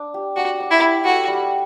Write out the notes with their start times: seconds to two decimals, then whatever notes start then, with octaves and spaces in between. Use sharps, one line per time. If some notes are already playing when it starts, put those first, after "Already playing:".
Already playing: D4
0.14 G4
0.36 D4 F#4
0.60 D5
0.71 E4
0.83 G4
1.05 F#4 A4
1.28 G3